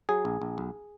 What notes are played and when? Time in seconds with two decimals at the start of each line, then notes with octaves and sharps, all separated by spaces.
0.09 F#3 G#4
0.25 A#1
0.42 A#1
0.58 B1